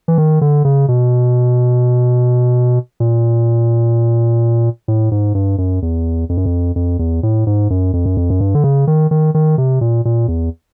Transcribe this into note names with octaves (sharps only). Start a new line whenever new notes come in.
E3
D#3
D3
C#3
B2
A#2
A2
G#2
G2
F#2
E2
F2
F#2
F2
F2
E2
A2
G#2
F#2
F2
F#2
F2
F#2
G2
D3
C#3
D#3
D#3
D#3
C3
A#2
A#2
E2